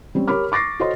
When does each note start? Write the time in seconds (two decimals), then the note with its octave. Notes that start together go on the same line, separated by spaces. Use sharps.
0.15 G3 C4 C#4
0.28 G4 A#4 C#5 B5 D6 F6
0.52 C#6 D6 A6 A#6 C7
0.80 F#4 A4 C5 C#5 D#5 C6